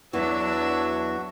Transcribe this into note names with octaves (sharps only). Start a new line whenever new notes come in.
E2 E3 F#3 D4 F#4 E5